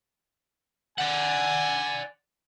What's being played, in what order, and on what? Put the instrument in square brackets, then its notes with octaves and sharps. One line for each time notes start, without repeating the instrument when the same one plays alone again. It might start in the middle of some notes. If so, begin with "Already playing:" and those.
[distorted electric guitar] D5 F#5 [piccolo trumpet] G#5